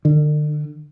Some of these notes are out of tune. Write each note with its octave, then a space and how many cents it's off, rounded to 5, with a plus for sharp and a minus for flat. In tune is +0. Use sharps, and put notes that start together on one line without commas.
D3 +35